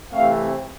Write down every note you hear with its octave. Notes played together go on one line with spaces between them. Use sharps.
C3 E3 A3 C4 F5